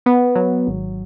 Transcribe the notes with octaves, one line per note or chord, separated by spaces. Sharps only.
B3
F#3
G#1